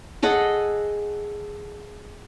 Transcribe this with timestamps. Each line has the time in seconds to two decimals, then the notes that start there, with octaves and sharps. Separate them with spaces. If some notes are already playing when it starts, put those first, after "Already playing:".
0.23 G#4 A4 D#5 F#5